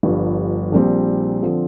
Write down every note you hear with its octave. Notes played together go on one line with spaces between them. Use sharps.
G1 G2 F3
A#1 A#2 G3 C4
D3 F3 C4